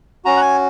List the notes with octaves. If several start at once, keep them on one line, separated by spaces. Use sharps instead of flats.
C#4 F#4 A#5
F#5
G#5